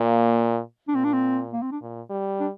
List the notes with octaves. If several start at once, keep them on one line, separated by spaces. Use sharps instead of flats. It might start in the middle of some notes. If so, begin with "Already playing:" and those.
Already playing: A#2 A#3
D4
A#2 C4
D4
C4
A#3
C4
D4
A#2
G3
D4